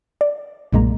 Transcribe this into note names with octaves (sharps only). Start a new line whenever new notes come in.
D5
B1 G2 A#2 G#3 A#3 A#5